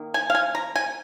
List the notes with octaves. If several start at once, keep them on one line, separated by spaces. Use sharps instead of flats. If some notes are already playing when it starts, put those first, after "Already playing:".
Already playing: D#3 A#3
G#5
F5
G#5
A#5
G#5